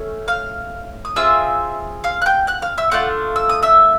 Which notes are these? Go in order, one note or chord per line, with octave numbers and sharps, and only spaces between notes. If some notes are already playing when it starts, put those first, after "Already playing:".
Already playing: A3 C#4
F5 F6
D#6
C4 F4 G#4 E5 E6
F5 F6
F#6
G5 G6
F#5 F#6
F5 F6
E5 E6
A3 D4 F4 F#5 F#6
E6
D#6
E5 E6